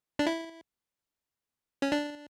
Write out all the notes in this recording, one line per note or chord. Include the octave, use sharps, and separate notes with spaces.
D4
E4
C#4
D4